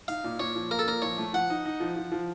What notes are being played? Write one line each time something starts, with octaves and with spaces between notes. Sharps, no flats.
D#4 F5
A#2
A#2 C#5
F3
A#3 A#4
A4
A#2 A#4
F3 C#5
A3
F3 F#5
D#4
D#4
F3
F3
F3